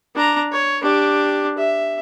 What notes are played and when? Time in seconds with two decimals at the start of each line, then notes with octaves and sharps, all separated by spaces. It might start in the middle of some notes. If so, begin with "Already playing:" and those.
0.15 D4 A#5
0.52 C#5
0.83 D4 G4
1.58 E5